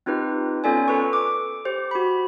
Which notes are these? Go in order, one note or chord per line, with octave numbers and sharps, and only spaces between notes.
C4 D#4 F4 G4 B4
B3 C#4 F4 A4 D5 G#5
A4 B4 C#6
D6
G4 C5
F#4 B5